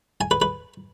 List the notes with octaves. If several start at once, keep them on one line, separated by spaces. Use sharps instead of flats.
G#5
B4
B4